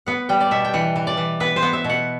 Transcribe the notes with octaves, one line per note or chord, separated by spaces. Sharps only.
B3 F#5
G3 G5
D5
B2 E5
G5
E3 F#5
E3
D5
E3
B3 B4
C5
B3
E5
B2
F#5